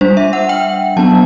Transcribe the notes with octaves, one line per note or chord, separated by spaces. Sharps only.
G3 D4 C5
E5
F#5
G5
F#3 B3 D4 A5